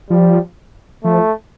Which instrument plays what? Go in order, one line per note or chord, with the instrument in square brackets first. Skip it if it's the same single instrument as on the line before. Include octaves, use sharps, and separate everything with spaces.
[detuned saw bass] F3 [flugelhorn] G3
[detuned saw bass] F3 [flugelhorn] A3